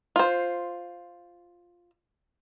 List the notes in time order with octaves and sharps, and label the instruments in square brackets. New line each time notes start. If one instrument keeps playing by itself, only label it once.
[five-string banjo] F4 C5